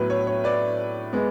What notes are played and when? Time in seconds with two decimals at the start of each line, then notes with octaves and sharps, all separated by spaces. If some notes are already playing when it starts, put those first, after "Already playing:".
Already playing: A2 F#3 B3 B4
0.10 C#5
0.27 C#5
0.44 B4 D5
1.13 G#3 B3